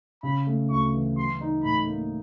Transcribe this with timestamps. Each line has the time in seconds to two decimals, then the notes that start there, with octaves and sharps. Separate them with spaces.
0.23 C#3 B5
0.47 A3
0.70 D2 C#6
0.93 E3
1.16 F#3 C6
1.41 D#4
1.64 A2 B5
1.87 A#3